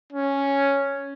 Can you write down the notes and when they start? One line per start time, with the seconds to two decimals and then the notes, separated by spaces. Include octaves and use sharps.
0.12 C#4